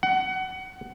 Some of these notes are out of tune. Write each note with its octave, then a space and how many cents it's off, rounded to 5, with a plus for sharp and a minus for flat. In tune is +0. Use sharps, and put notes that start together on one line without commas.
F#5 +25